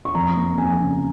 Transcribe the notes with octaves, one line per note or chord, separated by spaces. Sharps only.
C#6
F2 A#5
A#3
F2 G#5
C#3